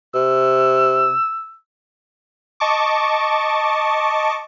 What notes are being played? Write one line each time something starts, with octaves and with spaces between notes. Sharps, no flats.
C3 E6
D#5 A5 C#6 D6